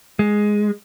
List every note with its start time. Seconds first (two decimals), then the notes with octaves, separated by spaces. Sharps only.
0.19 G#3